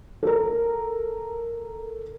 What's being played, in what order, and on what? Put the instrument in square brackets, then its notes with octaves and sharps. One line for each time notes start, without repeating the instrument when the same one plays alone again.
[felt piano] A4 A#4